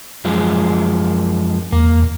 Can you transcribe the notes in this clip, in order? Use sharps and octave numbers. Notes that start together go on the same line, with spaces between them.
F#2 F3 G#3
E2 A#3